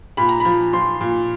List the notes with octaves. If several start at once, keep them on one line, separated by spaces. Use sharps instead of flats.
A#2 B5
A#5
B5
F3
F3 C6
A#2